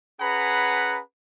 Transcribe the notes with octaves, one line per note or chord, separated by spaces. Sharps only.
C#4 G#4 B4 F#5 A#5 B5